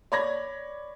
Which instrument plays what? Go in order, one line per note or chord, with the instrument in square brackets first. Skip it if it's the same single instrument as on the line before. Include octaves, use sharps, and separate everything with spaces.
[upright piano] C#5 D5 B5 G#6 A#6